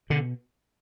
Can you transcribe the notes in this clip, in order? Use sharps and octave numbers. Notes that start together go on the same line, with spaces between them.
B2 D3